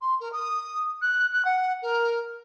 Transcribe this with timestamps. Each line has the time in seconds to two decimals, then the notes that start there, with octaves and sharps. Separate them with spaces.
0.01 C6
0.20 A#4
0.32 D#6
1.02 F#6
1.32 F#6
1.45 F#5
1.82 A#4